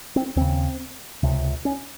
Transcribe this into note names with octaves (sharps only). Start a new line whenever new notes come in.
C4
D#2 C#3 C4
C#2 C3
C#4